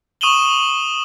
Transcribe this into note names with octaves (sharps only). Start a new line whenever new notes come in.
C#6 D#6 D#7 E7 F#7 G7